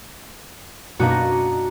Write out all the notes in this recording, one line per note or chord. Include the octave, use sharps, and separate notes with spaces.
F#2 B2 A#3 D4 D#4 F#4